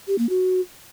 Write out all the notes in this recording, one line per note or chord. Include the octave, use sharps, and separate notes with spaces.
G4
A#3
F#4